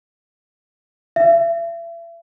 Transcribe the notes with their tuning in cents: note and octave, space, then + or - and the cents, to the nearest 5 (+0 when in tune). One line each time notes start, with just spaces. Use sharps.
E5 +40